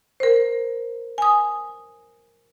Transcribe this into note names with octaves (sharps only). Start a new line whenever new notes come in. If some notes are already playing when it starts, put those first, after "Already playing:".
A#4 C5
G#5 D#6